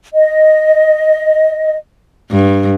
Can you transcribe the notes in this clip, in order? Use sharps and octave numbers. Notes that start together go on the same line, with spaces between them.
D#5
G2